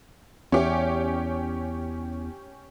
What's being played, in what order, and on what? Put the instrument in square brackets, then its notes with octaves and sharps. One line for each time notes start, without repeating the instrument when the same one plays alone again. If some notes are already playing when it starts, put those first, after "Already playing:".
[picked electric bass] E2 [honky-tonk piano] C#4 G4